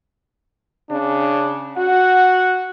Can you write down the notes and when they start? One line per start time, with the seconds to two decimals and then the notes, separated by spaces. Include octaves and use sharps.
0.91 C#3 D4
1.78 F#4 F#5